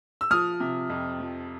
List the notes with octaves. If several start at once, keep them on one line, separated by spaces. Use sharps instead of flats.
E6
F3 D#6 F6
C3
F2
F3